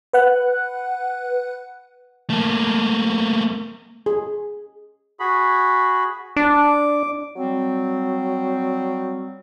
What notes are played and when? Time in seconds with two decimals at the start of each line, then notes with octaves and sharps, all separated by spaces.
0.13 B4 F#5 F#6
2.30 A3 A#3
4.06 G#4
5.20 F#4 G#4 B5
6.36 D4 D6
7.36 F#3 G3 C4